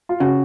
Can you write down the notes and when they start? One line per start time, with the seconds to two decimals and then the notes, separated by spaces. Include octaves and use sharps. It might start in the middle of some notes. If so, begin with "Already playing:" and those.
0.09 F4
0.20 C#3 F#4